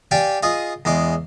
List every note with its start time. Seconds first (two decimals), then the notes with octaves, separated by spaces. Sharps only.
0.11 G4 D5 F5 G5 G#5
0.43 F4 G#4 D#5
0.85 E2 G#3 C6 D6